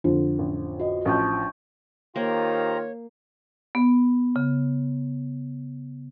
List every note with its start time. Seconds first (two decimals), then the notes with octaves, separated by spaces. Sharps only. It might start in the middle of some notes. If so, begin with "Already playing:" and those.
0.04 F2 D3
0.39 A1
0.80 F#4 D#5
1.05 A1 F3 D4 C#6 G6
2.16 D#3 A#3 F4 G4 C5 C#5 A#5
3.75 B3
4.36 C#3